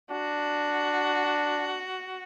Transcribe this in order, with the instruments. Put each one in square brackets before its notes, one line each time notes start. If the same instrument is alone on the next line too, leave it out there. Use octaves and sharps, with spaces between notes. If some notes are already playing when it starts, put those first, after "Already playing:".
[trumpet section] D4 [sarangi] F#4